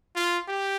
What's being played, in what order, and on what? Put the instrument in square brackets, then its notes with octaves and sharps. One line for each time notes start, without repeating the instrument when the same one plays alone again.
[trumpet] F4
G4